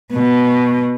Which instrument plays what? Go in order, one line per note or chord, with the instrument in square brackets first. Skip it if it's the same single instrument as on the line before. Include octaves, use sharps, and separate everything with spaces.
[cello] B2